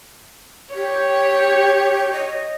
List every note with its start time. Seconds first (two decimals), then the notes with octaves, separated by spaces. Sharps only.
0.75 G4 C#5
2.13 D#5